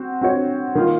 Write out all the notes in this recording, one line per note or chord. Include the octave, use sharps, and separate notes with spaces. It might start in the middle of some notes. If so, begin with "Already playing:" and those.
Already playing: C4 F#4
C4 F#4 C#5
D#3 A#3 F4